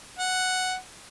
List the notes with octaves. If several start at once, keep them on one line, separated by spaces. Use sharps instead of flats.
F#5